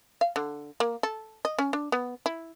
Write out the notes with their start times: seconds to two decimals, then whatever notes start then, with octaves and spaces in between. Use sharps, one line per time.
0.21 F5
0.36 D3
0.80 A#3
1.03 A4
1.45 D#5
1.59 C#4
1.73 D4
1.92 B3
2.26 E4